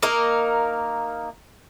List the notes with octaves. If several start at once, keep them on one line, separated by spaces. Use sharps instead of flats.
A#3 D#4 A#4